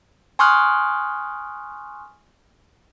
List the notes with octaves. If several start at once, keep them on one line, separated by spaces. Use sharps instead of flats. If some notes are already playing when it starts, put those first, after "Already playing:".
G#5 C6 C#6 D#6 F6 F#6